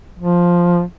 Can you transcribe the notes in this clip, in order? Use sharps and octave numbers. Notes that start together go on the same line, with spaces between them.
F3